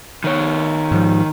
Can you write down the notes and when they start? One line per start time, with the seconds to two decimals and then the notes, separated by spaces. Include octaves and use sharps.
0.24 D#3 C#5
0.91 G#2 F3